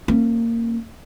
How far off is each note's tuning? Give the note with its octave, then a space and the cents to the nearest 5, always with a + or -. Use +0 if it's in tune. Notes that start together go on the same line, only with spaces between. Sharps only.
A#3 -20 C#4 -40